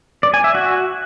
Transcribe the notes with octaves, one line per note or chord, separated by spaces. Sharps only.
D5
G#5
E5
F#4